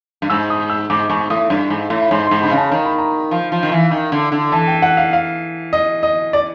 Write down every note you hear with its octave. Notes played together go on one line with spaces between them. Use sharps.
G2
G#2 E6
D#6
E6
G#2 D6
G#2 C#6
A2 D#6
G2
G#2
A2
B5
G#2 C6
C6
G#2
D3 B5
C#3
A5
D#3 A#5
B5
A#5
F3
F3
D#3
E3
D#3
D3
D3
E3 A5
G5
F#5
F5
F5
D#5
D#5
D5